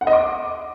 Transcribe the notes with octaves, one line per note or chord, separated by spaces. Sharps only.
F#5
D#5
D6